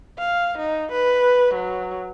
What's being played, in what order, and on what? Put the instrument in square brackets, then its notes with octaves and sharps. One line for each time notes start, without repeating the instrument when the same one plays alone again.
[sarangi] F5
D#4
B4
F#3